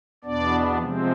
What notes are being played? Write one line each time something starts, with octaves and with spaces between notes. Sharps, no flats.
E2 B2 B3 D4 D5
C3 F3 G#3 C4